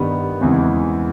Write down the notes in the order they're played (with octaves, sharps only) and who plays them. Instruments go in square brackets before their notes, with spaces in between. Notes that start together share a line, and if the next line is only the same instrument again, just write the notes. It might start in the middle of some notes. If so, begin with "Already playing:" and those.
Already playing: [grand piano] G2 D#3 G3 B3
E2 C#3 E3 G#3 C4